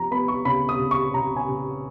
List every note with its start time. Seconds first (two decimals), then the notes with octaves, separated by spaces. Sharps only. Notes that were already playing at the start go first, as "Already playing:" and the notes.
Already playing: F3 B3 A#5
0.11 B3 B5
0.28 C#6
0.45 C#3 B5
0.69 D#6
0.79 C#3
0.91 C#6
1.14 C#3 A#5
1.36 G#5
1.48 C#3